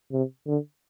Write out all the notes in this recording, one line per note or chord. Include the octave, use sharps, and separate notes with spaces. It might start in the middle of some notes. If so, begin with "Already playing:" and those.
C3
D3